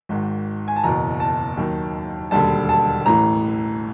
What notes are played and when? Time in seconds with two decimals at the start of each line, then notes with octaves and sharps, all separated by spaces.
0.09 G#1 G#2 D#3
0.68 G#5
0.76 A5
0.84 F#1 E2 B2 A#5
1.20 A5
1.57 D#2 D#3 F#3
2.31 E1 D#2 D3 G3 A5
2.69 A5
3.06 A1 A2 E3 A#5